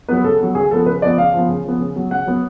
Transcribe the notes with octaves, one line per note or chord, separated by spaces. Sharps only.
F#3 B3 B4
C#3 A4
F#3 B3
C#3 G#4
F3 B3 A4
C#3 B4
F3 B3 D5
C#3 F5
F3 B3
C#3
F3 B3
C#3
F#3 B3
C#3 F#5
F#3 B3